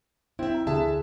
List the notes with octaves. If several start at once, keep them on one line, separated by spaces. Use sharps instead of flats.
C4 E4 E5
A#5
D2 D3 G#4 E5 A5